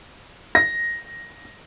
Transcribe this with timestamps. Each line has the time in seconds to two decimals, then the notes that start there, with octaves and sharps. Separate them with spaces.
0.55 A#6